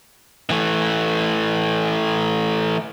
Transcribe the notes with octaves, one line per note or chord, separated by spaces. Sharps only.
E3 A3